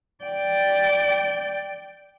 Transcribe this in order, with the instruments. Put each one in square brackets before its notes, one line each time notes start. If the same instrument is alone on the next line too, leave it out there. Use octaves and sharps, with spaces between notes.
[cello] D5 G5